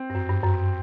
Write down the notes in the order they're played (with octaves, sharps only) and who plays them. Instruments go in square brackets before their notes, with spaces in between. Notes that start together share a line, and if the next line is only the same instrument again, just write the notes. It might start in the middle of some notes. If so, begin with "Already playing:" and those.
Already playing: [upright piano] C4
[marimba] G2
F#2
G2
F#2